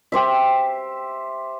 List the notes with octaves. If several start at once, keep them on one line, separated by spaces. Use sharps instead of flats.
G4 C5 E5